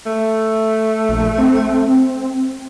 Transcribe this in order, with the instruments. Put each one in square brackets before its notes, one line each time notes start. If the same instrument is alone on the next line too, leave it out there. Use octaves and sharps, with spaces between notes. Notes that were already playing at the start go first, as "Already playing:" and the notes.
[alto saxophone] A3
[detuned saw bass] A#1
C4